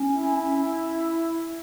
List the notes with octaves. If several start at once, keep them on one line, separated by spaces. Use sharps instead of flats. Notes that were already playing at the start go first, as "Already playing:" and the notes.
Already playing: C#4
E4